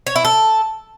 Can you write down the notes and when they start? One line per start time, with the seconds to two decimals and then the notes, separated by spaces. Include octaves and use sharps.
0.07 C#5
0.16 E4
0.25 A4